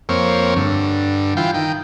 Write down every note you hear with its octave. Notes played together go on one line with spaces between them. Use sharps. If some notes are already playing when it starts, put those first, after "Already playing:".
F2 A#3 C4 C#5
G2 D3
E3 F4 G5
D#3 G5